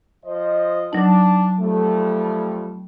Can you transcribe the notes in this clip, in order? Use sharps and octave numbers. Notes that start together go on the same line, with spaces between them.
F3 C5 D#5
F#3 D4 D#4 A5
F2 G3 A3